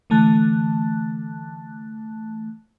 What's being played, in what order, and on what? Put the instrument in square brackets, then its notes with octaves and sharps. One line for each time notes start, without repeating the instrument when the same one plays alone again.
[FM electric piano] D3 E3 A3 A5 F#6